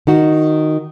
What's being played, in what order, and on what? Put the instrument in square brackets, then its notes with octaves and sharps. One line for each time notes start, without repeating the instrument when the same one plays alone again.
[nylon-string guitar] D#3 D#4 F#4